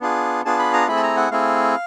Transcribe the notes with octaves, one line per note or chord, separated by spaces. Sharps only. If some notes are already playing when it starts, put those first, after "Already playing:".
B3 D4 F4 G#4
B3 D4 F4 G#4 A5
B5
A#5
A3 C4 E4 G#4 B5
A5
A#5
F#5
A3 C4 E4 G#4 F5